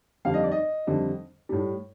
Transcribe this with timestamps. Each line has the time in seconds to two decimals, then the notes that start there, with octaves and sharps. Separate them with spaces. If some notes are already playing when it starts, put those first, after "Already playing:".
0.25 F2 D3 G3 F5
0.34 D#5
0.43 D5
0.52 D#5
0.87 F2 D3 G3
1.49 A2 G3